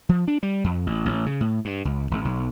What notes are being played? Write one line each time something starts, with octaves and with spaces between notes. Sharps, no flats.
F3
D4
G3
F2
A1
A1
C#3
A2
G2
C#2
G#1
B1